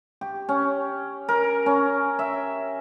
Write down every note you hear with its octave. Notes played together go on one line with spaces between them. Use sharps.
G4
C#4
A#4
C#4
E5